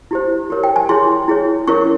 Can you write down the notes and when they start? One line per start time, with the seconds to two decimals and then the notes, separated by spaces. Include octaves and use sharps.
0.11 E4 G4 C5
0.50 G4 A#4 C#5
0.64 G5
0.76 G#5
0.89 E4 G#4 C#5 C6
1.28 E4 G#4 C#5
1.68 C#4 E4 A#4 C#5 C#6